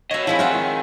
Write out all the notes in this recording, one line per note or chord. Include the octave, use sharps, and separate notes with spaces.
F#4 C#5 D#5 E5
F3 G#3 C4 E4
F#3 F4 E5 F#5
D#3